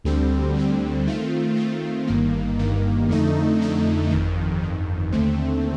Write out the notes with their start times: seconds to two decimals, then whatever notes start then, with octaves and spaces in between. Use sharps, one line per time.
0.04 D2 D3 G3 C4
0.55 D2 D3 G3 C4
1.07 D#3 A3 C4 F4
1.57 D#3 A3 C4 F4
2.07 G1 G2 D#3 A#3
2.58 G1 G2 D#3 A#3
3.09 F2 D3 A3 D#4
3.59 F2 D3 A3 D#4
4.11 G1 F2 D#3
4.62 G1 F2 D#3
5.12 D#2 D3 A3 C4